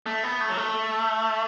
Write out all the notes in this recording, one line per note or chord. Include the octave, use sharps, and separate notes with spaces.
A3
B3
A3
F#3
A3